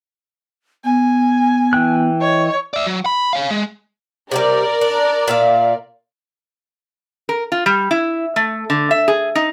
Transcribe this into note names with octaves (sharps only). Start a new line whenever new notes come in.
B3 G#5
E3 G5 F#6
C#5 D#5
D5 E5
F#3
B5
C#5 F5
G#3
C3 F3 G3 A#4 D5
D4
A#2 E5 F5
A#4
F4
G3
E4
A3
D3
E5
G#4
D#4